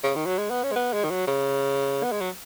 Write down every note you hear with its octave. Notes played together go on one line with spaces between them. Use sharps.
C#3
D#3
F#3
G#3
B3
C#4
G#3
B3
G#3
D#3
F#3
C#3
B3
G#3
F#3